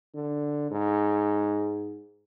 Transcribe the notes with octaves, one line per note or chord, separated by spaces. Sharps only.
D3
G#2